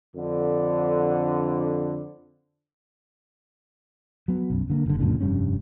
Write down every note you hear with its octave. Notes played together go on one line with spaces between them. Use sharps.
F2 D3
F#3 B3
B1 F#2
D3 A3 A#3
F#1 G2 D3
C#2 F#2 A#2 D3
F1 G2 G3 C#4